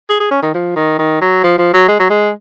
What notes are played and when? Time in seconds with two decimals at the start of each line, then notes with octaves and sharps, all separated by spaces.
0.10 G#4
0.20 G#4
0.31 C#4
0.43 D#3
0.55 F3
0.76 D#3
0.99 D#3
1.21 F#3
1.44 F3
1.59 F3
1.74 F#3
1.88 G#3
2.00 F#3
2.10 G#3